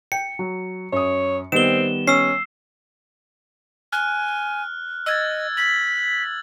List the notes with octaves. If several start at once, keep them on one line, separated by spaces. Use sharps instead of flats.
G5 C#7
F#3
F#2 C#5 D#6
D#3 G3 B3 C4 E7 G7
C#4 E6 C7
G#5 F6 F#6
D#5 E6 G#6 A6
B6 F#7